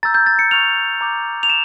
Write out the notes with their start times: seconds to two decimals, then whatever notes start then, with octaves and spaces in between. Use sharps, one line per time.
0.03 A#5 E6 G6 A6
0.14 G6
0.27 A6
0.39 C#7
0.51 C#6 F6 F7
1.01 A#5 D6 G6
1.43 F7
1.49 E7